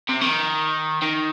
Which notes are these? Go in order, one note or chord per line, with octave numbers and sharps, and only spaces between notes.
C3
D#3
D#3